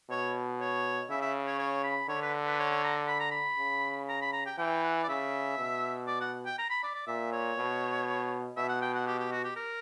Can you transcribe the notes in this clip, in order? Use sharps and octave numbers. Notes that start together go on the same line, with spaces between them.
B2 C#5
C#5
C#3 E5
E5
C#5
C#5
B5
D3 C#5
B4
B4
C#5
C#5
A#5
B5
A#5
B5
C#3
A#5
B5
A#5
G5
E3 G5
F#5
D5
C#3 E5
B2
D5
F#5
G5
A#5
B5
D5
D5
A#2 E5
C#5
B2
B2 E5
F#5
G5
F#5
G4
G4
F#4
G4
A#4